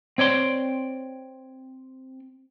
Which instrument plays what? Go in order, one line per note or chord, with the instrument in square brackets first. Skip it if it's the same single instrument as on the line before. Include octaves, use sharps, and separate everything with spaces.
[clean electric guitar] C4 C#5 D5 C6